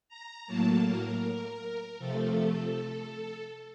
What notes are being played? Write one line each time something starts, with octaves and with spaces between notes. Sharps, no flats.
A#5
A2 F#3 A#3 A5
A#4
C3 F3 A3 A4